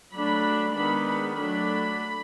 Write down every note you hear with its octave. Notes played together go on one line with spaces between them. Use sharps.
F#3 A3 D4 B5
D#3 G#3 B3 D4 B5
B5
F#3 A3 D4 B5